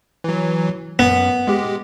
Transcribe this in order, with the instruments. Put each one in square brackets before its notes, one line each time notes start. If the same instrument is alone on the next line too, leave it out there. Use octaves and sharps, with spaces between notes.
[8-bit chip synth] E3 F#3
[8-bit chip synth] F#2 [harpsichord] B3
[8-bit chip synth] G#3 G4